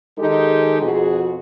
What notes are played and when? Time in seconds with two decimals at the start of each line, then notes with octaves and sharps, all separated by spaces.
0.19 D#3 G#3 D#4 G4 A4
0.82 F2 B2 F#4 G#4